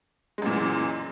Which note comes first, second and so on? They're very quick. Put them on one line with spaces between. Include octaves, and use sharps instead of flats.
G#3 F#2 A#2 E3